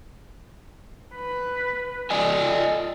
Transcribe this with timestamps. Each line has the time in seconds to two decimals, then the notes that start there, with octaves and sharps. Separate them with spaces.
1.15 B4
2.10 F4 A4 D5 D#5 G#5